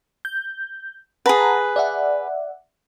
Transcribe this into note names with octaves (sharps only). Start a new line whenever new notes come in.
G6
G#4 B4 F#5 A5 A#5
D5 E5 F#5